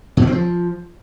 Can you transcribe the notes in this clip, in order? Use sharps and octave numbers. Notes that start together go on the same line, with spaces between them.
B2
B3
C4
F3